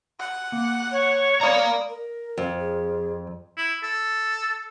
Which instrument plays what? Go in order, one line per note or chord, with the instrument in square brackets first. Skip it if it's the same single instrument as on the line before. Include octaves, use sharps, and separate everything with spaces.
[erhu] F#5
[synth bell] A#3
[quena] C#5
[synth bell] D5 B5 D#6 [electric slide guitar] F5 A#5
[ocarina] A#4
[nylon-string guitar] F2
[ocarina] G#4
[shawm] E4
A4